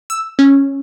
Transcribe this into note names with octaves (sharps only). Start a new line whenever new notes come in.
E6
C#4